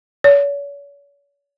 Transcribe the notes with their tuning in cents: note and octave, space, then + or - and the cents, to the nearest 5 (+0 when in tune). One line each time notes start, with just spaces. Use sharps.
C#5 +40